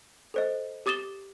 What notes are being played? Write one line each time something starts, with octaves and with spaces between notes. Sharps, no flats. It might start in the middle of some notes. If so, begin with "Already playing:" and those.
A4 C5 D#5
G4 D6 D#6 A6 E7 G7